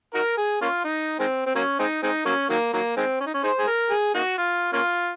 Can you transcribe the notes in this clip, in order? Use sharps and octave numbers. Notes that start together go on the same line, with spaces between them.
D#4 F#4 A#4
G#4
A#3 C#4 F4
D#4
D#3 G#3 C4
C4
F#3 A#3 C#4
G#3 C4 D#4
G#3 C4 D#4
F#3 A#3 C#4
D#3 F#3 A#3
D#3 F#3 A#3
D#3 G#3 C4
C#4
D#4
C#4
D#4 G#4 C5
G#4
A#4
G#4
A#3 D#4 F#4
F4
A#3 C#4 F4